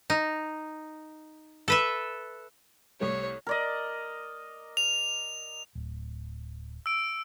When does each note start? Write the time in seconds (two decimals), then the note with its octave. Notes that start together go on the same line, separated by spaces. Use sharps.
0.10 D#4
1.68 A4 B4 E5
3.00 C2 G3 A3 C#5
3.47 A#4 D5 D#5
4.77 F7
5.75 D1
6.86 E6 D7